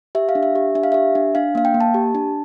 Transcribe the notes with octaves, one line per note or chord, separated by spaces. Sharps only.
G4 E5
F5
D4
E5
G4
D4 E5
F5
G4 E5
D4
D4 F5
A#3 F5
G5
A#3
A5
G4
D4